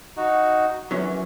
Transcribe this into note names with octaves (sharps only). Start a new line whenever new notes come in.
D#4 F#4
F#2 E3 F#3 C#4